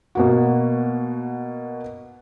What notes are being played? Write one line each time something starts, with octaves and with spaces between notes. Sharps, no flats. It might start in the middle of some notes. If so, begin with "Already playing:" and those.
B2 A#3 F#4